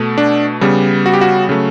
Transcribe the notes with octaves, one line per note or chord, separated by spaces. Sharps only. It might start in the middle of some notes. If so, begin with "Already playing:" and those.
Already playing: B2 A3
D4
C#3 G3 B3
F#4
G4
F#4
C#3 F#3 A3